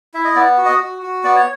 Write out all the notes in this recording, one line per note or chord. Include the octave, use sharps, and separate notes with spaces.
E4 E5
D#5
B3 D5
F#4
D#5
F#4
F#4
B3 D5
C#5